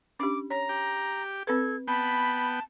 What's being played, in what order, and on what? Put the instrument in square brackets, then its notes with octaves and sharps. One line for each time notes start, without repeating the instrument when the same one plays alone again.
[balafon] C#4 D4 G4 [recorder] D6
[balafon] C#5 [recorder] A#5
[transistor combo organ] G4
[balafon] C4 B4 [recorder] A4 [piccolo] G#6
[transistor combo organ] B3 G5 [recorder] A5 [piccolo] B5